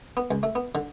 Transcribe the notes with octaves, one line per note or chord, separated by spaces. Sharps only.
B3
C#2
A3
B3
D3